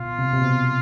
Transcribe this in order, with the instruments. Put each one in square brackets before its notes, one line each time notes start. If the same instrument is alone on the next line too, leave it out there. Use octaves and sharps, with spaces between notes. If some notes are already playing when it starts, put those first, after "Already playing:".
Already playing: [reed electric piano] B2 [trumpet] F4
[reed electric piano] C3
C3
B2